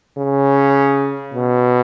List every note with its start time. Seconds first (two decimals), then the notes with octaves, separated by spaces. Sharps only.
0.18 C#3
1.34 B2